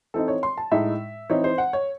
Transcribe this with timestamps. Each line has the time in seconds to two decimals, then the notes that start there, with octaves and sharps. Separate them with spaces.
0.14 E3 C4 D#4 A4
0.28 C#5
0.43 C6
0.58 A5
0.71 A2 G#3 D#4 E5
1.30 E3 C4 D#4 C#5
1.44 C5
1.58 F#5
1.73 C#5